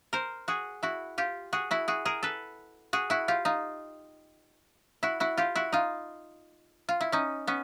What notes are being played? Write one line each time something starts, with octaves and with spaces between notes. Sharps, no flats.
A#4 C5
F#4 G#4
E4 F#4
F4 G4
F#4 G#4
E4 F#4
F#4 G#4
G#4 A#4
A4 B4
F#4 G#4
E4 F#4
F4 G4
D#4 F4
E4 F#4
E4 F#4
F4 G4
E4 F#4
D#4 F4
F4
E4
C#4 D#4
B3 C#4